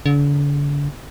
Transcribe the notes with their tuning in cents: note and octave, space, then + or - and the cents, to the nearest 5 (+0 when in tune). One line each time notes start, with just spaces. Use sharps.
D3 -40